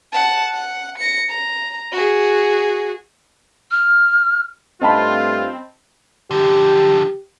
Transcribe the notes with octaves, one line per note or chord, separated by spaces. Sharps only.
F#5 A5
F#5
A#6 C#7
A#5
F#4 G#4
F6
G2 A3 C4 F4 D#5 A5 B5
D3 F3 G4